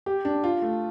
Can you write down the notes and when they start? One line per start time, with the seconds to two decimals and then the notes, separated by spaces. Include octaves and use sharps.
0.06 G4
0.25 D4
0.44 F4
0.62 A3